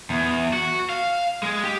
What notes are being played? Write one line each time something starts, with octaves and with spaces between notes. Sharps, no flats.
E2
F#4
F5
G#3
G4